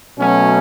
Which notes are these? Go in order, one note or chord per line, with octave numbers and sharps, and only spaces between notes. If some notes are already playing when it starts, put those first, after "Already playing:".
B2 F#3 A3 C#4